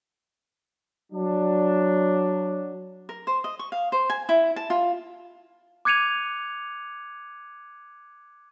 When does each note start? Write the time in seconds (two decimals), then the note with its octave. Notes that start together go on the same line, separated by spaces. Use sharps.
1.12 F#3 D4
3.09 A#4
3.27 C5
3.44 D#5
3.59 C#6
3.72 F5
3.92 C5
4.10 G#5
4.29 E4
4.56 A5
4.70 F4
5.85 D6 F#6 G#6 C#7 D#7 F7